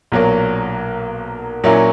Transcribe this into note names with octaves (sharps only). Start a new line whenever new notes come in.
B1 A#2 F#3 A#3
A#2 F#3 A#3 C#4 E4